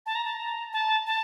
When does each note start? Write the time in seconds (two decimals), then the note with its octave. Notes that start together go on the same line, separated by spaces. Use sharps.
0.06 A5
0.15 A#5
0.25 A5
0.40 A#5
0.73 A5
1.06 A5